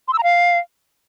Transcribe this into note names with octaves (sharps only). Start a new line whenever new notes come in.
C6
E6
A#5
F5